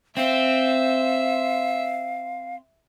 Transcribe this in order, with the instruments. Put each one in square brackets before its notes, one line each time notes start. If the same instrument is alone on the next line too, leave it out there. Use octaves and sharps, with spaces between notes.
[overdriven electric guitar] C4 [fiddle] E5 [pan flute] F5